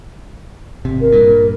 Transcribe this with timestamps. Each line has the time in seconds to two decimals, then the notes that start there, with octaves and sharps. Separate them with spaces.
0.85 G#1 C3
1.01 A#4
1.12 G2 A#2